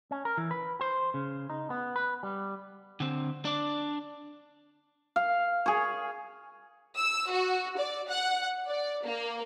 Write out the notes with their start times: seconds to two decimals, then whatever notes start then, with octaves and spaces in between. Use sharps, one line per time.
0.11 C#4
0.25 A#4
0.38 E3
0.51 B4
0.81 C5
1.14 C#3
1.50 D#4
1.70 B3
1.96 B4
2.23 G3
3.00 D3 C4
3.45 D4 D5
5.16 F5
5.66 G#4 C#5
6.96 E6
7.30 F#4
7.77 D5
8.08 F#5
8.68 D5
9.04 A#3